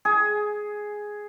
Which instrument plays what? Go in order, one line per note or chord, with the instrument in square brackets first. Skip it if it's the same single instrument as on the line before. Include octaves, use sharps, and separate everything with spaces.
[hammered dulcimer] G#4